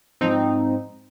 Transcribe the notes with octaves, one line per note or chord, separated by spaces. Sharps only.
G#2 F3 C4 D#4